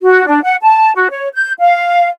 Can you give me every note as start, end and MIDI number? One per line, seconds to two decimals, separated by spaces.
0.01 0.23 66
0.26 0.42 62
0.43 0.55 78
0.62 0.91 81
0.95 1.08 66
1.10 1.27 73
1.34 1.51 91
1.59 2.08 77